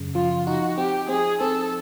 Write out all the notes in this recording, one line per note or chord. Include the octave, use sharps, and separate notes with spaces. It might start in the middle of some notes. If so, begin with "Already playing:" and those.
Already playing: F#2 C#3
F3 F4
D#4 F#4
C4 G4
C4 G#4
C4 A4